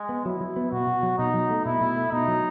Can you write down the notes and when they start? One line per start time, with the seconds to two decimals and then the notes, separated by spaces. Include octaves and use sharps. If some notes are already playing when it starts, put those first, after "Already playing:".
Already playing: G#3
0.09 B3
0.25 F#3 E4
0.41 F#3
0.56 B3
0.71 B2 F#4
0.87 B2
1.03 F#3
1.18 B2 D#4
1.34 F#3
1.50 A3
1.65 B2 E4
1.81 B2
1.96 A3
2.12 B2 D#4
2.28 F#3